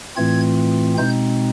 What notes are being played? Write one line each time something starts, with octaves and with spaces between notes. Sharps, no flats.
A2 E3 A3 C4 F4 G#6
B2 G#3 C4 D#4 G6